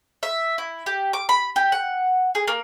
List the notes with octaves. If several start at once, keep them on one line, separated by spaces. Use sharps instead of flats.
E5
E4
G4
D6
B5
G4
F#5
G#4
A#3